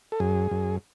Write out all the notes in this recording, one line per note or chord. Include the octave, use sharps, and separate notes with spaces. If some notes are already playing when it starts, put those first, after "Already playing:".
A4
F#2 G#4
F#2